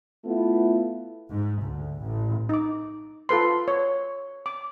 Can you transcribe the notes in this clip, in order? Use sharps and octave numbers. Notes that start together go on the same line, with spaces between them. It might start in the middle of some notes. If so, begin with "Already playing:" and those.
A3 B3 E4 F4
G#2
D2
A1
D#4 D6
F4 A4 B4 C6
C#5
D6